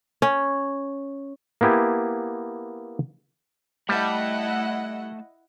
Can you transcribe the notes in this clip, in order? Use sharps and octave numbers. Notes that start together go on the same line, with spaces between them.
C#4
A#3 B3 E4 G4 G#5
G3 A3 E4 D#5 F#5 A5